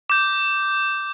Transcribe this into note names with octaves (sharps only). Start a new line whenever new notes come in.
D6 G6